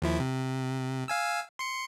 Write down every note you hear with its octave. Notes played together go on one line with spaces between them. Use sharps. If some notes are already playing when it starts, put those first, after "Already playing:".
D#2 F3 E4
C3
F5 G#5 E6
C6 C#7